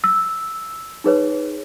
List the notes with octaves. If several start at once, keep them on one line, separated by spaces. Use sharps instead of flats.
E6
D#4 G#4 B4 C#5